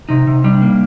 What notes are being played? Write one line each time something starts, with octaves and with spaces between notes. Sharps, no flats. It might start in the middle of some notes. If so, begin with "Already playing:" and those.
C3 D#4
C3
G3 D4
A#3